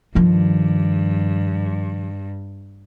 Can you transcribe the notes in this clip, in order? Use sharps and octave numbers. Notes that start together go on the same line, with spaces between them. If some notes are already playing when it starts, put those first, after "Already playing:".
G2 D#3 F3